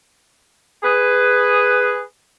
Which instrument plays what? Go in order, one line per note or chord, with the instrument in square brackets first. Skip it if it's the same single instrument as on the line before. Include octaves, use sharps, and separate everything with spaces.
[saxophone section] G#4 B4